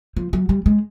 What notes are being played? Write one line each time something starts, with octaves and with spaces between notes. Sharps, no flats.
F3
F#3
G3
G#3